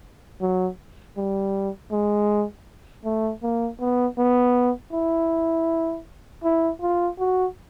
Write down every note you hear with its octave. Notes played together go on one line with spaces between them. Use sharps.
F#3
G3
G#3
A3
A#3
B3
B3
E4
E4
F4
F#4